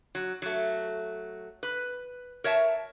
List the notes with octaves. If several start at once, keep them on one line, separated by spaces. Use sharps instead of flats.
F#3
F#3 A3
B4
A#4 C#5 E5 A5